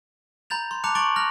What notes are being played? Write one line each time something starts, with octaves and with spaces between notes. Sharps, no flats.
A#5 B5 G6 A6 F7
C6
A5 A#5 D6 F#6 C#7 F7
C#6 D6 A6 D7 F#7
F6 F#6 A#6 F7